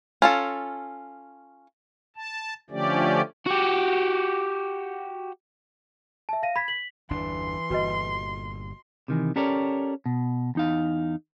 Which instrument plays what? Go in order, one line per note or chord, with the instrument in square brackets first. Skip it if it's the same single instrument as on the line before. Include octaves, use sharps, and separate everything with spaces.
[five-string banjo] C#4 F4 A4
[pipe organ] A5
D3 F3 A3 C#4 G4 D5
[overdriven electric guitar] F#4 G4
[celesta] E5 A5
F5 A#6 D#7
B5 G#6 B6
B6 F#7
[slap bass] G1 E2 D4 [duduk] E3 [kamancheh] C6
[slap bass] G1 A#2 [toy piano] F#4 B4 D#5
[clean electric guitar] C3 D#3 E3
C#4 G4 A4 A#4 C#5 D5
B2
E2 D#4 F5